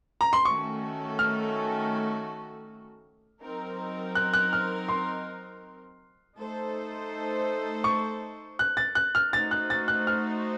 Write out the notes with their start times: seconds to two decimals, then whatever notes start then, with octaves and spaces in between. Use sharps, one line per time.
0.21 A#5
0.33 C6
0.45 D#3 A3 C#4 F#4 A4 C#6
1.19 F6
3.42 F#3 C4 D#4 A#4
4.15 F#6
4.34 F#6
4.53 F6
4.88 C6
6.37 A3 D#4 A4 C5
7.84 C#6
8.59 F#6
8.77 A6
8.95 F#6
9.15 F6
9.32 A3 D#4 F#4 C5 A6
9.51 F#6
9.70 A6
9.88 F#6
10.07 F6